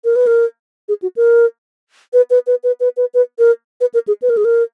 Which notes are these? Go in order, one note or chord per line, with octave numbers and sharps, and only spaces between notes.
A#4
B4
A#4
G#4
F#4
A#4
B4
B4
B4
B4
B4
B4
B4
A#4
B4
A#4
G#4
B4
A#4
G#4
A#4